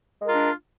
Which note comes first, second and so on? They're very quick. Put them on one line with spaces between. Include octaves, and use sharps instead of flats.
G#3 A#4 F4 D4